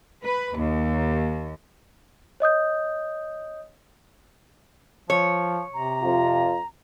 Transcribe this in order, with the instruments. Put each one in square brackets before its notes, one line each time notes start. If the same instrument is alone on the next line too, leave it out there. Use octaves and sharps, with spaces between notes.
[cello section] B4
D#2
[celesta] C#5 D#5 D#6 G6
[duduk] F3 [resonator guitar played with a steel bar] C#5
[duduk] C3 [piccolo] A#5
[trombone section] F2 F4